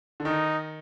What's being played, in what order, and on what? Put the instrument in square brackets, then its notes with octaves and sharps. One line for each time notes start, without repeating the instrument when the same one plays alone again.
[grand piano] D3
[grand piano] D#3 [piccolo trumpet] D#4